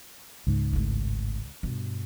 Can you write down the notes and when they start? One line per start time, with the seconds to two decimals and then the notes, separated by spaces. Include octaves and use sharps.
0.47 C#2 G#2
0.73 G#1 A2
1.63 G2 B2